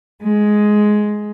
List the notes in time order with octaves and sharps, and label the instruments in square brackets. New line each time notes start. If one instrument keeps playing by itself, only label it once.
[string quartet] G#3